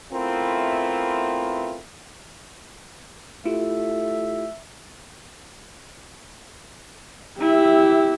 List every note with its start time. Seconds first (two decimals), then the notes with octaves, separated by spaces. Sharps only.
0.12 A3 B3 C4 E4 F4 A#4
3.45 A3 E4 F4 G4 E5
7.40 E4 G4 E5